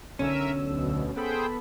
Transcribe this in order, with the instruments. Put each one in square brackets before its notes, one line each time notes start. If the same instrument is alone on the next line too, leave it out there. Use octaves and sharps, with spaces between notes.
[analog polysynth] B1 D3 E6 [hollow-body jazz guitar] C#4 [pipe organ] A#4 E5
[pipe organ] D2 B2
[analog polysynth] B3 A4 B5 [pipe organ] G#4 C5 G5